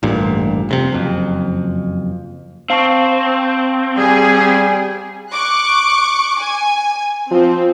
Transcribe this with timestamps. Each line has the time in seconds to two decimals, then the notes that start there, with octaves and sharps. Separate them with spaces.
0.03 A1 D2 G2 A#2
0.69 F1 G#2 C3
0.92 F#1 F2
2.70 C4 F5 A5 C#6
3.97 G3 G#4
5.31 C#6 D6 F#6
6.39 G#5
7.31 F3 C4